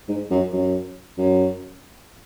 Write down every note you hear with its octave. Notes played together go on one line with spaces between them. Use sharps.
G#2
F#2
F#2
F#2